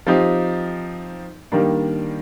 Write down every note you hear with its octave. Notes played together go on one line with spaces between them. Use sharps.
F3 C4 D#4 G4
D#3 G3 A#3 D4